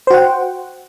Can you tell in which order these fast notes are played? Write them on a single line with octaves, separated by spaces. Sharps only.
C5 F#4 F#5 G5